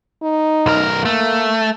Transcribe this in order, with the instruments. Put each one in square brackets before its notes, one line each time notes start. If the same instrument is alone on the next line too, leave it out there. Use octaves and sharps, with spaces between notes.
[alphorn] D#4
[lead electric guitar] B1 A#4
[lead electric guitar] A3 [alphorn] A#3